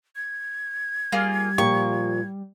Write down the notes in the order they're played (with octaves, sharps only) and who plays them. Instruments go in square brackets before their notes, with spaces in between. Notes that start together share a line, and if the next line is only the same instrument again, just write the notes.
[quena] G#6
[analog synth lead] G3 [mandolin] A#3 F4 G#4
[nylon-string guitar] A#2 F3 G4 [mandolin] C#6